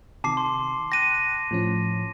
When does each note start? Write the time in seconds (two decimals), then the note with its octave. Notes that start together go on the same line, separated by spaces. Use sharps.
0.24 C3 D#3 A5 D6 C7
0.37 C6
0.92 G5 C6 F#6 A#6 D#7
1.51 A2 F3 C#4